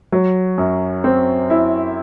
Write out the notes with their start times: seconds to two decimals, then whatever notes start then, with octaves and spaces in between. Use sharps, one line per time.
0.12 F#3
0.58 F#2
1.04 C4
1.50 E4